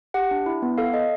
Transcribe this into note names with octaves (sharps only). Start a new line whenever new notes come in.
G4 F#5
D4
E4
B3
A4 F5
A4 D#5